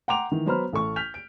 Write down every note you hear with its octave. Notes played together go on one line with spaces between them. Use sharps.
F#5 G5 A#5 C6 D6 F7
D#3 E3
F#3 B3 C5 A#5 B5 F6
A1 A4 C#6
F6 G6 B6 F7
D7